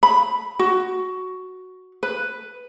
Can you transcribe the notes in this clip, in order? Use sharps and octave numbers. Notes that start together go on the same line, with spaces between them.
B5
F#4
B4